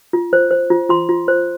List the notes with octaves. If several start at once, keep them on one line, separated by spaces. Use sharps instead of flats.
F4
C5
C5
F4
F4 C6
F4
C5